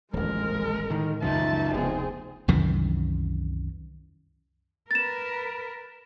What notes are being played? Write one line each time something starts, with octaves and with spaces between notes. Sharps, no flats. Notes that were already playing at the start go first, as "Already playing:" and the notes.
D#1 A1 F2 G#3 A#4
A2 D3 D#3
C#2 F#2 C#3 E3 F3 D#4 E5 A5
F1 D2 B3 C4 G#4
C2 F#2 D#3 E3
A#4 B4 A6 E7